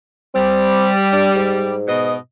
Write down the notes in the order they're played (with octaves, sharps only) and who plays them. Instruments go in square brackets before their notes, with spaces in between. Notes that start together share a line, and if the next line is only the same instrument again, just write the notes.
[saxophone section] G3 [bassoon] C4
[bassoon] D4
G#2
[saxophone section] B2 D#5